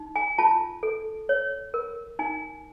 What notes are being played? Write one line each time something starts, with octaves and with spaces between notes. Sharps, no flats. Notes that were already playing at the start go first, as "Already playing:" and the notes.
Already playing: D#4
G#5
F4 A5
A4
C#5
A#4
D#4 G#5